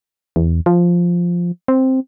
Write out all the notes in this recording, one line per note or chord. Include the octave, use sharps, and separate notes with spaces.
E2
F3
C4